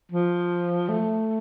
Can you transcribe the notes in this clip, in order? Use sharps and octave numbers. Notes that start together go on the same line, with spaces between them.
F3
A3